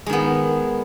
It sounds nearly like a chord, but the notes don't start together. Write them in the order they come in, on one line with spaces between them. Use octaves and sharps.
G#3 D#3 B3